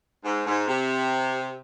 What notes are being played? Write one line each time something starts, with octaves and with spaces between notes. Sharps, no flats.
G#2
G#2
C3